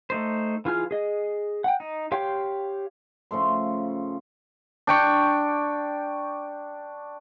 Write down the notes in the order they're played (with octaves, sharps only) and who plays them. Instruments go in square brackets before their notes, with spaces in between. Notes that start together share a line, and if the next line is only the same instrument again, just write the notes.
[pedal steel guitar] A3 D#4 C5
E3 F4 G#4 F6
G#4 D#5
F#5 G5
D#4
G4 C#5 F5 G5 C6
[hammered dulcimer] C#3 F3 A3 C6
D4 G5 C#6